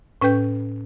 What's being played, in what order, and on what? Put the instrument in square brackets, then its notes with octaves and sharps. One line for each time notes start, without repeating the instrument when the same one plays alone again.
[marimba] A2 C#4 B4 G5 G6